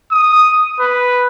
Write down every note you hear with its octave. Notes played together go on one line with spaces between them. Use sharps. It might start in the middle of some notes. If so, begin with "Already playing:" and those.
D#6
B4